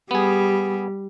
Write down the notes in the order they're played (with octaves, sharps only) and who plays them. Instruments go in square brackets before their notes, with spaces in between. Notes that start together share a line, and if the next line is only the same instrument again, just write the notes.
[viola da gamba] G3 [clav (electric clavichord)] B3 G#4